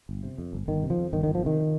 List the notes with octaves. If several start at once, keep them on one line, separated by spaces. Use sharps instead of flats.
G1
C3
F2
G1
G1 D#3
C3
F3
F2
G1 D#3
D#3
G1
F3
C3 D#3